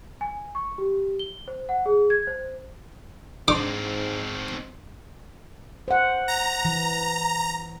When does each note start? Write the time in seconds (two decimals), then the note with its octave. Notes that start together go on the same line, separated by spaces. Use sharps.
0.21 G#5
0.55 C#6
0.78 G4
1.19 G7
1.48 C5
1.69 F#5
1.86 G#4
2.10 G#6
2.27 C5
3.48 G#2 C4 D4 D#4 C6 D6
5.88 C5 F#5
6.28 A#5
6.65 E3